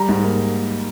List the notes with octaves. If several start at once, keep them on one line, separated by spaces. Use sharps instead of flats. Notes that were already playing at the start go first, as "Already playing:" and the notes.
Already playing: G3 A#5
G#2
A#3